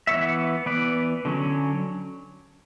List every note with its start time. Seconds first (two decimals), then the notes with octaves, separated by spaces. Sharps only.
0.07 E3 B3 C#5 E5
0.66 E3 B3 B4 D5
1.25 D3 F#3 C#4